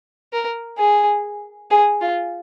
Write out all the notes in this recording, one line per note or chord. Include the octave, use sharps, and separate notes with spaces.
A#4
G#4
G#4
F4